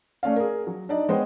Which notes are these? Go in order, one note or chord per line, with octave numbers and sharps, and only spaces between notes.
A3 C#4 D5 F5
G#4 A#4
F#3
D4 D#4 D5 D#5
G#3 B3 C5 C#5 D#5 G5